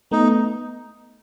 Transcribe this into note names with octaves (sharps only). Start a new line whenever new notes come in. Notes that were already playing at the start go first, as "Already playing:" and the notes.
A3 B3 D#4